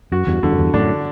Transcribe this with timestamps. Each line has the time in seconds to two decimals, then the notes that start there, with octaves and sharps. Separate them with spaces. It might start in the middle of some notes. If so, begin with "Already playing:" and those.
0.12 F#2 F#4
0.27 E2 G2
0.43 E2 G2 D3
0.52 F#2
0.58 E2 G2
0.74 F#2 A2 D4